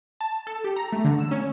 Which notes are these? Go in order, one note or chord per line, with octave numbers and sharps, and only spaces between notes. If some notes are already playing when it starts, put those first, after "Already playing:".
A5
A4
G4
A#5
A3
D3
E6
C#4